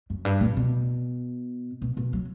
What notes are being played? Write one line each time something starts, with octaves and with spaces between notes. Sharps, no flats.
F#2
G2
A#2
B2
B2
B2
F#3